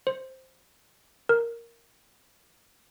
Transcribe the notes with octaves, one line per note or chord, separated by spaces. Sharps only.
C5
A#4